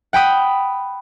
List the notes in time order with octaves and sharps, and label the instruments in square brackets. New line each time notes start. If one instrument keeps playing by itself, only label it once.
[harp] F#5 G5 B5 D#6